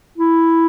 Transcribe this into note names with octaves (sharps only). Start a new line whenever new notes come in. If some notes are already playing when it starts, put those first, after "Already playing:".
E4